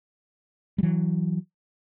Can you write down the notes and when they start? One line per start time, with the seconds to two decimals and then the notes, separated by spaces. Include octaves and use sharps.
0.78 G3
0.83 E3 F#3